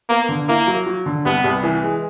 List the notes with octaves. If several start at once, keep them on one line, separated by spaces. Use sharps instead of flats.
A#3 B3
D3
A#3 E4
F#3
F#3
D3
C2 B3
C2
E3
G#3